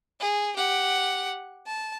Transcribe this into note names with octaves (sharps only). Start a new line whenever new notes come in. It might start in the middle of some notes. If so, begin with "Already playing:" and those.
G#4
G4 F#5
A5